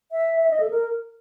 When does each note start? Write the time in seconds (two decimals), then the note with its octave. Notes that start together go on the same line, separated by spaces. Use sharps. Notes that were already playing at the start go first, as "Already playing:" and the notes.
0.12 E5
0.41 E5
0.50 D#5
0.60 A4
0.70 A#4